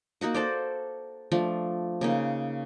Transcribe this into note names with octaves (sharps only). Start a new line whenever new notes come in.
A#3 D#4 F#4 F#5
F#4 A4 C5 D5
F3 A3 D4
C#3 A#3 D#4